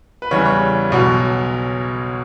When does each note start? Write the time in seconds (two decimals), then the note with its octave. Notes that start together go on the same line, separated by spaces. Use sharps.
0.22 B4
0.31 E2 C#3 E3 G3 C#5
0.46 C#5
0.90 B1 B2 F#3